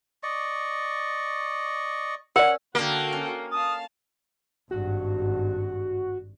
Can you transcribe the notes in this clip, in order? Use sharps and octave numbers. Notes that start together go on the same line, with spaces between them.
D5 D#5 C#6
C#4 A#4 D5 F#5
D3 A#3 F#4 A4 F5 G5
C#4
F5 A5 D#6
G#1 G2 F#4